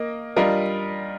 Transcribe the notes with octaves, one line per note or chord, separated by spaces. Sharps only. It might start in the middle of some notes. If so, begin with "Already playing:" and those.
Already playing: A#3 D#5
G3 D4 F4 A#4 D#5